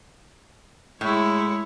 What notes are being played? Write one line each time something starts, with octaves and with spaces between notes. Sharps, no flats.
A2 G#3 E4 C#5